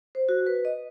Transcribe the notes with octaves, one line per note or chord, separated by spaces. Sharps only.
C5
F#4
B4
D#5